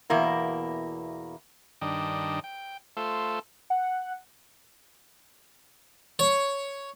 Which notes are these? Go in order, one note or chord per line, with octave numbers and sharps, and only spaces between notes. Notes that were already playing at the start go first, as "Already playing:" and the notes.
E2 B2 A#3 E4
G2 D#3 D4 D#5 G5
G5
A3 F4 A4 C5
F#5
C#5